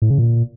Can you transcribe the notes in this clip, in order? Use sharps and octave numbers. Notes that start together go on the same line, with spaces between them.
A2
C#3
A#2